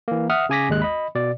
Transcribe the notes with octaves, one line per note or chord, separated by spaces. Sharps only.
E3 A#3
E5 F#5 D#6 F6
C#3 G#4 G#5 D6 A#6 B6
G#1 D#2 G#3 F#6
D#5 B5
B2 D5